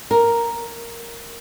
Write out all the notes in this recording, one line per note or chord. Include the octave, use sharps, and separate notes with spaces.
A#4